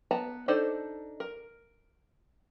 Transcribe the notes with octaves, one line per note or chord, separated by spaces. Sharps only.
B3 A5 A#5
D4 D#4 A4 C5 D5
A#4